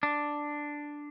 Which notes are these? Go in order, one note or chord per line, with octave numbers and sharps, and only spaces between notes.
D4